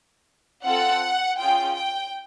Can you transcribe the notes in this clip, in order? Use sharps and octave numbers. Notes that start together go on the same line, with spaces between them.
C4 F4 A4 F#5
C#4 F4 G#4 G5
G5